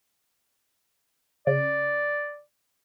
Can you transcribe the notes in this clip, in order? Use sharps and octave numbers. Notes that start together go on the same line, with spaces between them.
C#3 D5